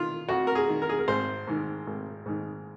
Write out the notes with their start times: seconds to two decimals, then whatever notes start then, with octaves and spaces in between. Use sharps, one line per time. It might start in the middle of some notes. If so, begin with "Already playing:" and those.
Already playing: D#3 F4
0.29 F2 F#4
0.47 A#4
0.55 G#4
0.68 D#3
0.82 A#4
0.89 G#4
0.99 A#4
1.08 G#1 C5
1.47 G#2 D#3
1.87 G#1
2.26 G#2 D#3